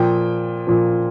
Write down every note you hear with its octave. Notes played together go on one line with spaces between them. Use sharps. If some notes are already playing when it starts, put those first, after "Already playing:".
Already playing: A#2 F3 G5
A#2 F3